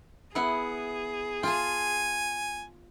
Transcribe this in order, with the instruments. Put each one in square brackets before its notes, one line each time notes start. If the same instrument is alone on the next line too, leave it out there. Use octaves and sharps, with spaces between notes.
[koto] B3 E4 F#5 [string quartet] G#4
[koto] F4 A5 [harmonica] G#5